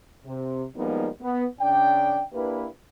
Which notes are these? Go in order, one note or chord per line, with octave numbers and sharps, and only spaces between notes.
C3
F3 G3 G#3 A#3 B3 D#4
B3
C#3 D4 D5 G5
A#3 D4 E4 G4 B4